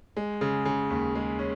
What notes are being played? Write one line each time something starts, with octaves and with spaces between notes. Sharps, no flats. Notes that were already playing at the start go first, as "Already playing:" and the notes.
G#3
C#3
C#3
D#2
G#3
C#4